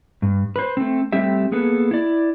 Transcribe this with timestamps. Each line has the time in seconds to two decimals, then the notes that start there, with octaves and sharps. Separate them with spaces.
0.22 G2
0.56 B4 C5
0.77 A3 C4
1.13 G3 A3 C4 G4 E5
1.52 A#3 B3 G#4 A4 B4
1.91 E4 D5